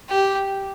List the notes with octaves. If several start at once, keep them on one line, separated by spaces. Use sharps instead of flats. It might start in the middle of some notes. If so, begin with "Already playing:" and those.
G4